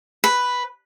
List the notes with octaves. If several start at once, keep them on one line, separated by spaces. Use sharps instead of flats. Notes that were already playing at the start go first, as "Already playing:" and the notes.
B4